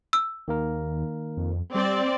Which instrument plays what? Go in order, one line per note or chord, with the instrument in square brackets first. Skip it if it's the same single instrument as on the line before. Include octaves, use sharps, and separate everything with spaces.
[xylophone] E6
[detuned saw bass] D#2 [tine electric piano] D#3 A#3 A#4
[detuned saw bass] F2
[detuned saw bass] G3 [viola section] C4 D5